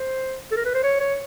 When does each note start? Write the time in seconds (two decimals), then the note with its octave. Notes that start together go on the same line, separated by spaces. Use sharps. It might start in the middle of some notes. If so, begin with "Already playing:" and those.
Already playing: C5
0.52 A4
0.57 A#4
0.65 B4
0.74 C5
0.83 C#5
1.00 C#5